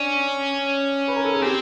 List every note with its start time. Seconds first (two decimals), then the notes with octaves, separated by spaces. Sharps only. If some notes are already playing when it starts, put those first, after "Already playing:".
Already playing: C#4 D4
1.08 B4
1.16 A#4
1.25 A4
1.33 G#4
1.42 C4 G4